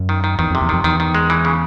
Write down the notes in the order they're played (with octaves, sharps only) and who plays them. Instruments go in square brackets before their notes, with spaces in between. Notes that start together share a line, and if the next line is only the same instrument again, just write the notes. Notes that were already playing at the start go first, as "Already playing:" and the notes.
Already playing: [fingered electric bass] F#2
[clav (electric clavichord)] D#3
D#3
[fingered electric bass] E2 [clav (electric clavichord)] D#3
[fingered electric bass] F2 [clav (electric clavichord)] C3
[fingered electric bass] E2
[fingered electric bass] F2 [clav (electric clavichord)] D#3
[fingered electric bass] E2 [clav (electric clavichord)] D#3
[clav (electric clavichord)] D#3
G#3
E3
C#3